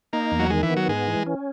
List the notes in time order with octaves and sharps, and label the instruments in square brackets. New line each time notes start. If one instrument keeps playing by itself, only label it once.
[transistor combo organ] A#3 [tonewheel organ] D#4
[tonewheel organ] E2
[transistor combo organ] F#3
[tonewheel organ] D#3 [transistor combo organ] G#3
[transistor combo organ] E3
[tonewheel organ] B3
[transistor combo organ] F#3
[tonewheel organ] G#2 [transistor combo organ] G#3
[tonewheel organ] E3
C#4